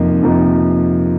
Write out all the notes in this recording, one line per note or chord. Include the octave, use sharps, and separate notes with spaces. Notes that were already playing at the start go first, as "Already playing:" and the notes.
Already playing: F2 C3 F3 A#3 D#4
F2 C3 F3 A#3 D#4